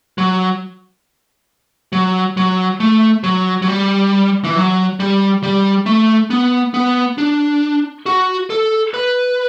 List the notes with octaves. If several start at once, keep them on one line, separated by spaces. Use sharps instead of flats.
F#3
F#3
F#3
A3
F#3
F#3
G3
E3
F#3
G3
G3
A3
B3
B3
D4
F#4
A4
B4